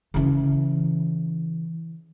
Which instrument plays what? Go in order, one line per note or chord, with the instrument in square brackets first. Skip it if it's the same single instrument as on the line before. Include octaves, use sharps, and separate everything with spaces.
[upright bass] C#3 E3